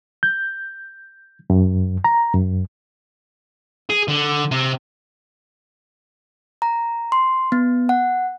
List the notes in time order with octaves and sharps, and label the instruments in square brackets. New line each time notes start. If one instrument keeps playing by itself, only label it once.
[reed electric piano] G6
F#2
A#5
F#2
[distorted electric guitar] G#4
D3
C3
[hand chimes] A#5
C6
B3
F#5